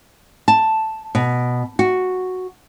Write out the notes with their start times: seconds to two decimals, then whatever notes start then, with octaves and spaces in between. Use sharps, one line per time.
0.48 A5
1.15 B2
1.79 F#4